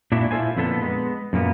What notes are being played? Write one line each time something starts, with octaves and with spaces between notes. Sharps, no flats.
A#2 D4 E4 F#4
E4 F4 A4 C5 G#5
F2 A#2 D3 B3 D4 A4
G#3 B3
F#2 A#2 A#3 B3